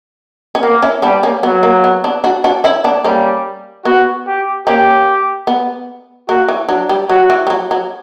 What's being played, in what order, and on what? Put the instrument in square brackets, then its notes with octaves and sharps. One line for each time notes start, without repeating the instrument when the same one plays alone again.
[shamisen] C#4
[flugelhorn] A#3 [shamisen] B3
[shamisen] C#4 E4
[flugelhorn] G3 [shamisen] B3 D4
[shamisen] A#3 C#4
[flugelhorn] F#3 [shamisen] B3
[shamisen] A#3
B3
B3 D4
D4 F#4
D4 F#4
C#4 E4
B3 D4
[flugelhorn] G3 [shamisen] A#3 C#4
[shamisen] B3 [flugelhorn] F#4
[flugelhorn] G4
[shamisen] A#3 C#4 [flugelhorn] G4
[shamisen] B3
[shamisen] A#3 [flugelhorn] F#4
[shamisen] E3
[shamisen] F#3 [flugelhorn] D4
[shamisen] G3
[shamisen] F#3 [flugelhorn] F#4
[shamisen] E3
G3
F#3
F#3